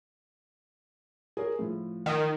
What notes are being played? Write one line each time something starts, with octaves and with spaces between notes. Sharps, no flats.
G#4 A#4 C#5
A2 F3
D#3